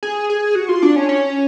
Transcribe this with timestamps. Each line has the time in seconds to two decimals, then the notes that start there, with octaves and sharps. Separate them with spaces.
0.03 G#4
0.30 G#4
0.55 F#4
0.69 F4
0.82 D4
0.96 C#4
1.09 C#4